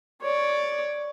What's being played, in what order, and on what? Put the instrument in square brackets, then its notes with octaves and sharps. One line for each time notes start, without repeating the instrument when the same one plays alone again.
[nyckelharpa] C#5 D5